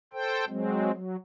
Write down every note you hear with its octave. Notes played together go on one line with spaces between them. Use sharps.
A4 C5 G5
F#3 G#3 C4
F#3